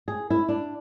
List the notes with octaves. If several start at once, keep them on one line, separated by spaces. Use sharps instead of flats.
G#4
E4
D4